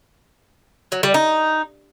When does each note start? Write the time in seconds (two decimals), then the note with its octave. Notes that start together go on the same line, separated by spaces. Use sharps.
0.92 F#3
1.03 G3
1.14 D#4